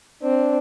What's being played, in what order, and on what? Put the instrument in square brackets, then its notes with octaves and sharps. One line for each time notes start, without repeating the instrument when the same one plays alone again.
[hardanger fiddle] C4 [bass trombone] D4